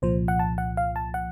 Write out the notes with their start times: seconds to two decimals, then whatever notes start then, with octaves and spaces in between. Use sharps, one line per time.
0.02 C2 A#2 F3 C5
0.28 F#5
0.39 A5
0.58 F#5
0.77 F5
0.96 A5
1.14 F#5